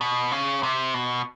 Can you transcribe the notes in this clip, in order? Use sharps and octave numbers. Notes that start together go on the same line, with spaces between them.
B2
C#3
C3
B2